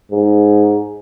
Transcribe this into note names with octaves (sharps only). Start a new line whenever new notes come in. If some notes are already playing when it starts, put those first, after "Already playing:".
G#2